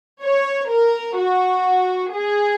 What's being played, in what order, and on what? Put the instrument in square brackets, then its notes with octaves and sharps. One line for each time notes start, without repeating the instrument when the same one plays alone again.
[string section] C#5
A#4
F#4
G#4